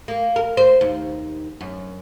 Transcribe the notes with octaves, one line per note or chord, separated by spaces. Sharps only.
A#3
A#4
C5
D#2
F#2